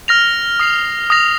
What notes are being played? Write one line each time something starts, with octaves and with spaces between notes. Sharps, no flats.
F6 A#6 F7
D#6 C7 F7
D#6 A#6 F7